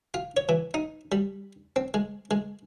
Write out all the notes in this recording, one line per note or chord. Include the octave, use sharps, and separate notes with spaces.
F4
C#5
E3
D#4
G3
C4
G#3
G#3